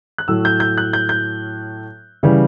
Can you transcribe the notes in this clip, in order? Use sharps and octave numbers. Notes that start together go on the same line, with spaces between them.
F#6
A2 F#3 E6
G6
G6
F#6
G6
G6
C#3 E3 G3